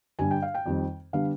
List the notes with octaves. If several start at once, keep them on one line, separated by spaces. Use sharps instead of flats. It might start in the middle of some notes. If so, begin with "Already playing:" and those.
G2 D3 G3 D4 G#5
G5
F5
G5
F2 D#3 G3 C4
D3 G3 B3 D4 F5